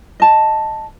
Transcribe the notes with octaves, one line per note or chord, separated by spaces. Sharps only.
D#5 A5